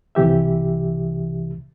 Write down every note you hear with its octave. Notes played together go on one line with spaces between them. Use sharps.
C2 C3 E3 G4 E5